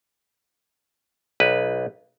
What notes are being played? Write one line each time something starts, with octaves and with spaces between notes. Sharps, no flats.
B1 B4